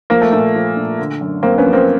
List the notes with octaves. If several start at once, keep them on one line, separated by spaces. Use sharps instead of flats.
F3 A#3
A3
A#2 A3
F3
A#2
D3
F#2
F#2 A#3 C4
B3 C#4
F3
A#3 C4